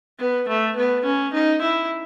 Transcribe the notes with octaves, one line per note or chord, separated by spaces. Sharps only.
B3
A3
B3
C#4
D#4
E4